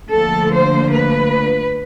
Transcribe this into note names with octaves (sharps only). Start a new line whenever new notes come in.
D2 D3 F3 A#3 A4
C5
B4